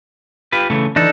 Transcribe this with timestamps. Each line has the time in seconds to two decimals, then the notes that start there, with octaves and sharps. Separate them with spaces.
0.52 F4 G4 B4
0.70 C#3 E3 A3
0.96 E3 D4 D#4 A4